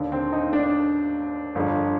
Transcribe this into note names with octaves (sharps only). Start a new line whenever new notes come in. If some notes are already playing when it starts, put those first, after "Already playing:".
Already playing: D#2 D3
C4
D#4
D4
G1 F2 D3